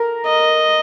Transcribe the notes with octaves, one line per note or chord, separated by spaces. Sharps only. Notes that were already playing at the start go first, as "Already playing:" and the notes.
Already playing: A#4
D#5